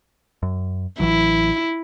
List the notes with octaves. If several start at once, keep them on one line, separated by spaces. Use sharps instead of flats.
F#2
A1 E3 F#3 E4